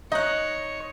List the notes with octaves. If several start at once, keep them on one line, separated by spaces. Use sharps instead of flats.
D#4 C#5 D#5 F#5